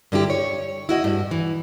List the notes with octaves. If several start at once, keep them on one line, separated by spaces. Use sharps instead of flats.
G2 D3 E4 G4
C#5
E4 F#4 D#5
G2
E3